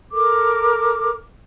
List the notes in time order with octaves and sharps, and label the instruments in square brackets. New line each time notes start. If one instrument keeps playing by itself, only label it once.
[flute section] A4 A#4 D6